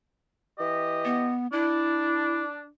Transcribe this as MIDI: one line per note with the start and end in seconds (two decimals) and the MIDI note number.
0.59 1.33 52
0.59 1.33 67
0.59 1.33 75
1.05 1.47 59
1.53 2.67 62
1.53 2.42 64